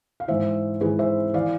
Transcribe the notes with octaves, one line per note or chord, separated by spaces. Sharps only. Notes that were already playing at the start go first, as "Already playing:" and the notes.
F5
G#2 E3 C5 E5
G#2 E3 G#4 B4
C5 E5
E3 D5 F5